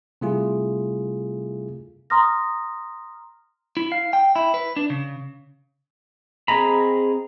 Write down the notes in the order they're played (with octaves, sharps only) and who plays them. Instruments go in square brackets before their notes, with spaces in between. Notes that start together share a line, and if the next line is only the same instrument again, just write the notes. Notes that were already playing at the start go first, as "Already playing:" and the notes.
[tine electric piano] C3 G3 A3 E4 F4 G#4
[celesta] A#5 C6 D#6 F6 A#6
[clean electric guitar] E4
F5
G5
E4
B4
D4
C#3
[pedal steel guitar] C4 G#4 D#5 A#5 B5